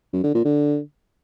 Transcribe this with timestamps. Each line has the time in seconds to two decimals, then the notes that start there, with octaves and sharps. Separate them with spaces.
0.13 F#2
0.24 D3
0.34 A#2
0.45 D3